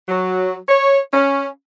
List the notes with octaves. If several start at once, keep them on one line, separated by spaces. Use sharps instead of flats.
F#3
C#5
C#4